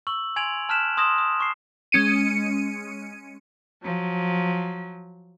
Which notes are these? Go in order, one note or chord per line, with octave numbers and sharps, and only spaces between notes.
C#6 E6 F#7
G#5 C6 G#6 D7 F7 F#7
A5 F6 F#6 B6 E7
C6 D#6 G#6 A#6 E7
D#6
C#6 C7
G#3 C#4 C#7 D#7
F3 F#3